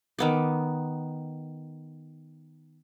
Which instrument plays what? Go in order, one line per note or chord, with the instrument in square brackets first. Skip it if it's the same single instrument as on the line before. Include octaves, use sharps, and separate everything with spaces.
[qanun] D#3 B3 D6